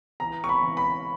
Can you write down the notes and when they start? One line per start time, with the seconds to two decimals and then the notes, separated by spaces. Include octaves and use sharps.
0.20 E3 A#5
0.44 C#6
0.49 B5
0.62 E3
0.77 B5